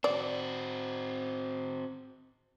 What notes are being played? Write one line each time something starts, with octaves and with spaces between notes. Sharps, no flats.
C4 F#4 D5